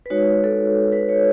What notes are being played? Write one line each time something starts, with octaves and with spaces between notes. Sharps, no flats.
B4
G#3 D#4 F#4 C#5
A4
B4
C#5